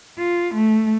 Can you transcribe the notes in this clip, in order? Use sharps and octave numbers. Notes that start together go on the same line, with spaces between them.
F4
A3